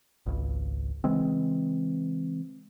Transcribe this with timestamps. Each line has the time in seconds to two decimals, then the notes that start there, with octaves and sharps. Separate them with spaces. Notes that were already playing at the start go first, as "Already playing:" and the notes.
0.26 G#1 C#2
1.04 C#3 E3 G#3 C4